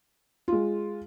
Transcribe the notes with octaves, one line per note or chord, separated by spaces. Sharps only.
G#3 F4